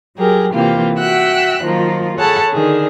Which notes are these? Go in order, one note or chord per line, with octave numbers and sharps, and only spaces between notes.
F#3 G4 G#4 A#4
C3 E3 A#3 F4 G4
F#4 E5 F#5 G5 E6 F#6
D#3 F3 F#3 A#3 F4
G#4 A4 C#5 F#5 A5 B5
D3 D#3 G#4